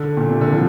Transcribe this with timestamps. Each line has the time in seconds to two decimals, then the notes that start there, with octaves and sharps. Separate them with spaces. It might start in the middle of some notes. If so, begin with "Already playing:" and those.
Already playing: D3
0.17 A#2
0.29 C3
0.41 D3
0.53 F3